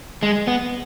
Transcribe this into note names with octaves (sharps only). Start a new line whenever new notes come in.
G#3
B3